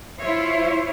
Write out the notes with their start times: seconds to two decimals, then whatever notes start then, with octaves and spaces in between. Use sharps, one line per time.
0.21 E4 F4 C5 C#5 E5